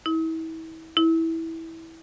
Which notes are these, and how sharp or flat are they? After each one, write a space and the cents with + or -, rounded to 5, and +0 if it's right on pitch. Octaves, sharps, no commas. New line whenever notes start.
E4 -35
E4 -15